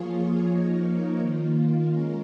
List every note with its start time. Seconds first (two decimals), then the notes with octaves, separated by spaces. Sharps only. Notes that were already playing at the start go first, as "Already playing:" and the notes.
Already playing: F3 A#3 F4 G#4 C#5
0.50 F3 A#3 D#4 A#4 C#5
1.19 D#3 A#3 F4
1.87 G#3 C#4 A#4